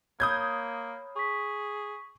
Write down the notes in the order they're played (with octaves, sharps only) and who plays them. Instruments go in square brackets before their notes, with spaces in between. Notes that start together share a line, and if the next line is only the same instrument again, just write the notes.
[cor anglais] A#3 [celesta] C#5 B5 [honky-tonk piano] D#6 G6 G#6
[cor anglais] G#4 [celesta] C#6 B6